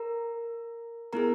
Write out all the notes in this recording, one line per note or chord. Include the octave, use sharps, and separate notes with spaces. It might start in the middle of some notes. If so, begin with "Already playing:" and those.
Already playing: A#4 A#5
B3 E4 G#4 A#4 A#5